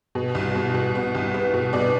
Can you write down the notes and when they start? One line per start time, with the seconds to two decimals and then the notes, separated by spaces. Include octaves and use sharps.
0.15 B2
0.35 C2
0.55 B2
0.74 B2
0.95 B3
1.15 C2
1.34 B3
1.54 B2
1.73 B2 D5